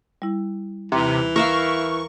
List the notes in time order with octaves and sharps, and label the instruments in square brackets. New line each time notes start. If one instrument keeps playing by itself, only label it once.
[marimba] G3 E4
[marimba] D#2 A#5 C6 [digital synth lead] C3 [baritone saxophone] E3
[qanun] A#4 E5 F5 [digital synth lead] C#6